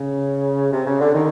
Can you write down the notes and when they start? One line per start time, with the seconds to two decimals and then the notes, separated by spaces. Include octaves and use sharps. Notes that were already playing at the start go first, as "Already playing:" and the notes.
Already playing: C#3
0.72 C3
0.87 C#3
1.00 D3
1.14 D#3